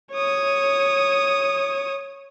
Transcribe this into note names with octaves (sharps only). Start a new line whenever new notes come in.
C#5 D#6